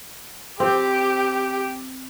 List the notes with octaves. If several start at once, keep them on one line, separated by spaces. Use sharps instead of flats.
C4 G4